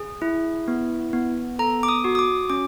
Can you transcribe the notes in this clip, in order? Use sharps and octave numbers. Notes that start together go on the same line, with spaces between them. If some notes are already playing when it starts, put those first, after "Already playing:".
Already playing: G#4
E4
B3
B3
A4 A#5
D6
D#6
F#4
D#6
D6
C#4 D6